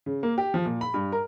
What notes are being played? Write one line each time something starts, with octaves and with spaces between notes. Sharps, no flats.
C#3
A#3
G4
F3
A#2
B5
G2
A#4